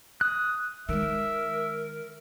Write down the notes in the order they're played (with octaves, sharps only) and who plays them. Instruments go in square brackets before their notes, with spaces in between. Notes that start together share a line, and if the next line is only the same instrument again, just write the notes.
[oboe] D#6 [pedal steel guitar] F#6
[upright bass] D#3 G#3 [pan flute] A#4 [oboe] E5